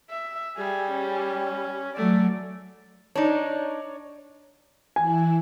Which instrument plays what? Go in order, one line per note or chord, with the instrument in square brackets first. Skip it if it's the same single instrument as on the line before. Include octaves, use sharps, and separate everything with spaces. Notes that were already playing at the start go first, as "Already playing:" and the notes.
[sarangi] E5
[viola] G3 [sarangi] G#4
[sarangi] C#4
[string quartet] F#3 [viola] A3 [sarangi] D5
[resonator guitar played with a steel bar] D4 D#4 [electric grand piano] C#5 D5
[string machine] E3 E4 [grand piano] G#5